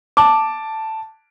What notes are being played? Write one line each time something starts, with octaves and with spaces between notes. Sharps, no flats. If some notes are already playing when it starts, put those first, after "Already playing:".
A5 D6